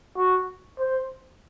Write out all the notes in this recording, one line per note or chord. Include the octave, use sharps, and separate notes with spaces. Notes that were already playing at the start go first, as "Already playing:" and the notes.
F#4
C5